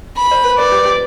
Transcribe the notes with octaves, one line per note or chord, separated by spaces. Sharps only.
B5
C5
B4
B4 D5
G4
G4